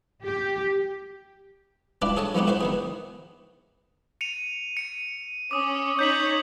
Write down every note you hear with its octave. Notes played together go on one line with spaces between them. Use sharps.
G4
D4 E4 F4 G4 B4
G#4 A4 C#5 G#5 A5
F3 B3 D#4 F#4 G4
E4 F#4 B4 C5
D#3 B3 G#4
C#7 D#7 F7
C#7 D#7
C#4 D6 D#6
D#4 C#5 G6 B6 F#7